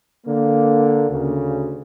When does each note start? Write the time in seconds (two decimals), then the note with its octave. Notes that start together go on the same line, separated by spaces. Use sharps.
0.25 D3 A#3
1.09 D2 C#3